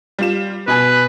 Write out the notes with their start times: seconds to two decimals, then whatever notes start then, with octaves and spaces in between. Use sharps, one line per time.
0.19 G3 F4 E7
0.68 B2 B4 G#5